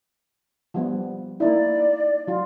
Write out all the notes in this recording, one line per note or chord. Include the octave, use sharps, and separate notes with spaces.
F3 G3 B3
A#3 D#4 E4 D5
F#3 F4